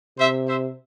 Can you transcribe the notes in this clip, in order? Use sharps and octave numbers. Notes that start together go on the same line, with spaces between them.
C3 C5 E5
C5 E5